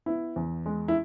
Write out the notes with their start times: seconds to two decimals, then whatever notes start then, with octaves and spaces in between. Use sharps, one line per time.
0.06 B3 E4
0.36 E2
0.66 G#3
0.88 E4